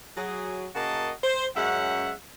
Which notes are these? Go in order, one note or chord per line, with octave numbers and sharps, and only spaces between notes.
F#3 G#4
C#3 A#3 F#4 A#4 D#5 A5
C5
F#2 G#3 C#4 E5 F#5